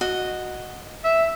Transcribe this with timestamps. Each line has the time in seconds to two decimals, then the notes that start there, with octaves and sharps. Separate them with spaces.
0.01 F#4 D#5
1.04 E5